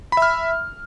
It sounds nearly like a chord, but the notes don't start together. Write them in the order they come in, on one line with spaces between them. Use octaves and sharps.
B5 E5 F6